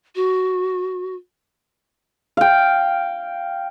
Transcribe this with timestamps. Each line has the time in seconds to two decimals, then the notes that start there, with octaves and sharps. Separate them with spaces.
0.15 F#4
2.37 F5 G5